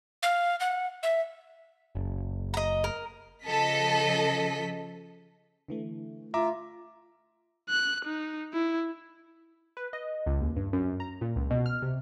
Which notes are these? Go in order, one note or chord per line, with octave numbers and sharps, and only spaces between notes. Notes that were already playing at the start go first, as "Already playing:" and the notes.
F5
F#5
E5
F#1
D#5 A#5
A#4
C#3 F3 A4 D#5 B6
D3 E3 A3
F4 E5 A#5 D6
F#6
D#4
E4
B4
D#5
C#2
D#2
G2
F#2
A#5
A#2
C#2
B2
F6
C3